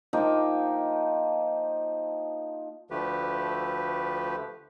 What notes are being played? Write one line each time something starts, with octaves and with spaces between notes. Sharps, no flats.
F3 A#3 D#4 G5
D2 D3 F3 A3 G4 B4